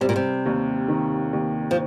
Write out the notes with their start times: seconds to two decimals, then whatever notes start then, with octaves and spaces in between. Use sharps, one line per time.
0.01 C3 G3
0.09 A#2
0.16 C3
0.46 D#2
0.88 D#3
1.33 D#2
1.71 F3